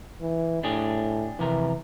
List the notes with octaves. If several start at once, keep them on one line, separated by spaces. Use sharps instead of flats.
E3
A2 D4 G4 G#4
F2 C3 E3 A#4